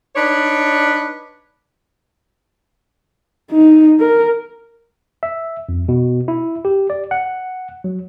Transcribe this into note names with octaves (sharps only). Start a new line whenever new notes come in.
D4 D#4 B4 C#5 D5
D#4
A#4
E5
F2
B2
E4
G4
D5
F#5
F#3